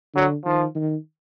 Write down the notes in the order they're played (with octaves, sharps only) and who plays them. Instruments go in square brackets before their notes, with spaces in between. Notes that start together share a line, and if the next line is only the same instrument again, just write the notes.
[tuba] D3 [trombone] F#3
[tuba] D#3 [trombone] F3
[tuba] D#3